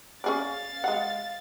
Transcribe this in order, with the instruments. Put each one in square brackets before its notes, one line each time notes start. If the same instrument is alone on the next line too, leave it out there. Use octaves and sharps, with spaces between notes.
[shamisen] C#4 G#4 D5 [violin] F5 A6
[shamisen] G#3 F#5